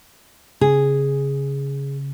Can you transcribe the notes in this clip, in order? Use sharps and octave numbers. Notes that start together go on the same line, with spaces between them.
C#3 G#4